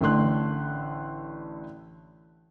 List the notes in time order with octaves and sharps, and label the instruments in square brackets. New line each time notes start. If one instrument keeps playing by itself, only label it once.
[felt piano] A1 D3 A3 C6 F#6